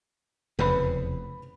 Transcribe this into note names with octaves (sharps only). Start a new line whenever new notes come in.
F1 E2 C#3 B4 B5